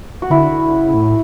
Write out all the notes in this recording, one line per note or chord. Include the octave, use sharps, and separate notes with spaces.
F#4
D3 E4
D3
C#3
A2